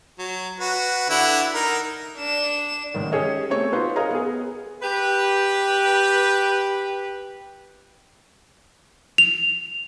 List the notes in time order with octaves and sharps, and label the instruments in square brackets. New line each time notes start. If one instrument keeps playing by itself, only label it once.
[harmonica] F#3
F#4 B4
D3 E4 F#5
D#4 A#4
[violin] D4 E7
[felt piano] A1 G#2 D#3
C#4 G4 G#4 C#5 D#5
A3 B3 C4 C#5 C#6 C#7
D#4 F4 F#4 B4 C5
G#4 A#4 C#5 D#5 F5 A#5
B3 G#4
[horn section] G4 B4
[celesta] F7